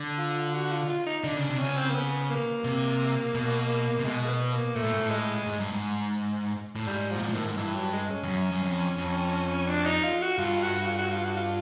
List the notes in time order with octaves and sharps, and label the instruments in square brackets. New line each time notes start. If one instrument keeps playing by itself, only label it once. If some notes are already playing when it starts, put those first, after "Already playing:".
Already playing: [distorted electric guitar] D3
[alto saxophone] F4
F#4
F4
F4
D#4
[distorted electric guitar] D3 [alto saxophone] D4
[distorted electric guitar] C#3 [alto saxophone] D4
[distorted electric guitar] C3
[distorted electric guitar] C#3 [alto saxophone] C#4
[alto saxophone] C4
A#3
B3
A#3
[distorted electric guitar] C3
B2
C3
[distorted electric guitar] B2 [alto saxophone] G#3
[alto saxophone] A#3
B3
A#3
[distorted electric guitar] A#2 [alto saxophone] A3
[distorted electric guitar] A2
G#2
A2
[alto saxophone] G#3
[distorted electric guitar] G#2
G2
G#2
A2
[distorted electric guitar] G#2 [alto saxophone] G3
[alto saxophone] F3
[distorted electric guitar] A#2
[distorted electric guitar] A2 [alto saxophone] D#3
[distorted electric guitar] G#2
[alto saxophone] D#3
[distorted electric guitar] G2 [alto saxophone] E3
[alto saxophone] F#3
G#3
C#4
[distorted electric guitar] F2
F#2
F#2
F2
F2
[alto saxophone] D4
D#4
F4
F#4
[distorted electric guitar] G2 [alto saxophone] F4
[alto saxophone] F#4
F4
F#4
F4
F#4
F4